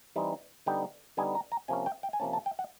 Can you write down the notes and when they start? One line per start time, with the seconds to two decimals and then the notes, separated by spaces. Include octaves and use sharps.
0.16 E3 G3 C4 D#4
0.66 D3 G3 B3 D#4 G5
1.17 D3 G3 B3 D#4 G#5
1.35 A#5
1.52 A#5
1.68 C3 F3 A#3 C#4 G#5
1.86 G5
2.03 G5
2.13 G#5
2.20 C3 F3 A#3 C#4 A5
2.33 A5
2.46 G5
2.59 F#5